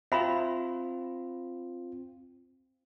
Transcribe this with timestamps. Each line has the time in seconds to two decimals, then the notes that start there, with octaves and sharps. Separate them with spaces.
0.12 C4 F4 E5 B5